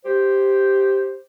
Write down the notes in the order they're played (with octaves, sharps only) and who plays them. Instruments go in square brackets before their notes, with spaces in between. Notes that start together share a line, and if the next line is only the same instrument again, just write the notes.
[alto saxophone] G4 [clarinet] C5